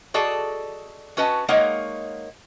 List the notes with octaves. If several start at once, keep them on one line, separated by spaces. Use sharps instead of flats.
F#4 G#4 A4 D5 D#5
C#4 F#4 B4 D#5 A5
G#3 A#3 D#4 C#5 D#5 F#5